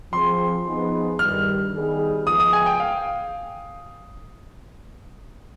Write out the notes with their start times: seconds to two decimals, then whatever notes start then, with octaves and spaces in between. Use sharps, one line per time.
0.13 F3 C4 F4 G#4 C6
0.66 F3 B3 D#4 G#4
1.19 G2 D#3 G3 F6
1.74 D#3 G3 B3 D#4 G#4
2.26 F3 G#3 B3 F4 G#4 D#6
2.40 D#6
2.53 G#5
2.66 G5
2.80 F5